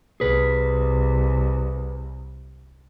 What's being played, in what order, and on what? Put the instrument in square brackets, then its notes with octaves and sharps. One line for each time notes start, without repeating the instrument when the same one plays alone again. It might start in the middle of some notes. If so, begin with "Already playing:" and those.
[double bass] C2 [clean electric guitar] G#4 B4